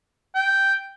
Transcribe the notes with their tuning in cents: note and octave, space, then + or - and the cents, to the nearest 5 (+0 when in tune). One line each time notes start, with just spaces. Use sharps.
G5 -5